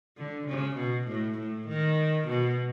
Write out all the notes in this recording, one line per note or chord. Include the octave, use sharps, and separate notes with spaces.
D3
C#3
B2
A2
A2
D#3
B2